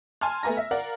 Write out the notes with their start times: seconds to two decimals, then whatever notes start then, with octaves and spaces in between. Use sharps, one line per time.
0.21 G#5 A5 C6 F6
0.43 A3 B3 G#5 A#5 A#6
0.57 E5
0.71 A#4 D5 F5 F#5